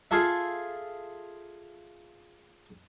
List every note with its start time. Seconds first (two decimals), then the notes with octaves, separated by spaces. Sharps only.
0.11 F4 G#4 A4 E5